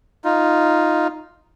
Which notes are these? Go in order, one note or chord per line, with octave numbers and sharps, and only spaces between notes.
D#4 F4